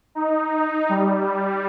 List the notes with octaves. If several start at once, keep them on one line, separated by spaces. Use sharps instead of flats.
D#4
G3